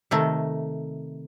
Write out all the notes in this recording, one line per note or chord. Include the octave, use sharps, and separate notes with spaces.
C3 D#3 A3